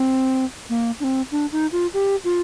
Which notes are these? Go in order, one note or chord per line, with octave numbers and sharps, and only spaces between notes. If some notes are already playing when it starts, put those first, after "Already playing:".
Already playing: C4
A#3
D4
C4
D4
D#4
F4
G4
F4